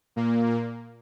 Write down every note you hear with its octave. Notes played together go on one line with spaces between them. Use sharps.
A#2 A#3
A#2 A#3